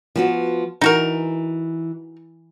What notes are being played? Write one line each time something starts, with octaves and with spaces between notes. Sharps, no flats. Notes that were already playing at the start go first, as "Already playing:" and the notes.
F3 B3 F#4
E3 D#4 F#4 A#4